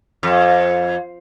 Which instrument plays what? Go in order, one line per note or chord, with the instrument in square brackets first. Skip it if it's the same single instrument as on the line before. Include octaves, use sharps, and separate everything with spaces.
[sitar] F2